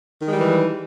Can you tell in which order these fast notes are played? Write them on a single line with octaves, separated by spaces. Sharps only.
D#3 G#3 G3 E3